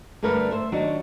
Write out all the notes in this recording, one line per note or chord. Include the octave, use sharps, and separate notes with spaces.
G2 D3 A3 A#4 B4
C5 E5
D#3 F#3 D4 F#4